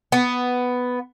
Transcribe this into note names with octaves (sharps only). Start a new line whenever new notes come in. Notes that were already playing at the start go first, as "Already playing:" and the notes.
B3